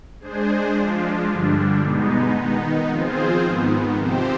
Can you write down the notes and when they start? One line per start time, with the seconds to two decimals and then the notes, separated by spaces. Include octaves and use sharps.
0.20 G#3 D4 G#4 C5
0.74 F3 G#3 D4 F4
1.27 G2 D3 G3 D4
1.82 B2 G#3 B3 D#4
2.35 D#3 B3 D#4
2.88 F3 C4 F4 G#4 C5
3.43 G#2 D#3 B3
3.96 C3 F3 C4 G4 C5